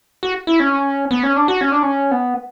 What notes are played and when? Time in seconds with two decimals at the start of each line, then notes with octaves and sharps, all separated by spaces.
0.23 F#4
0.47 E4
0.60 C#4
1.11 B3
1.23 C#4
1.36 D4
1.48 F#4
1.61 C#4
1.72 D4
1.83 C#4
2.11 B3